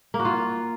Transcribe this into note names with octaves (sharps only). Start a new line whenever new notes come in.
A#3
F#4
F4